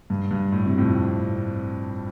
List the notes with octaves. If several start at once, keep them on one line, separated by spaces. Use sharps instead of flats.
G2
G2
A2
C3
F2 A2